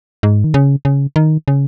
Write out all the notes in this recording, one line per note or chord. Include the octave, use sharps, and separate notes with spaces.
G#2
D#3
C#3
C#3
D#3
C#3